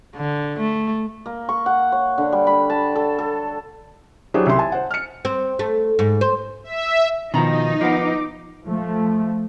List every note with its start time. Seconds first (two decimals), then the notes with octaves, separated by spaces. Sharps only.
0.16 D3
0.59 A3
1.26 A#3
1.49 C#6
1.66 F#5
1.92 C#5
2.18 D3
2.32 G3
2.47 B5
2.70 A5
2.96 A4
3.19 A4
4.34 F#3 D4 E4 G4 G#4 C5
4.47 C2 C3 E4 C6
4.59 G#5 A5
4.72 C5 F#5
4.91 F6 C#7
5.25 C4
5.59 A3
5.99 G#2
6.21 C5
6.64 E5
7.34 B2 D#3 F3 D#4 D#5 A#5 B5
7.81 F3 B3 A#4 F#5 A#5 D6
8.64 F3 A3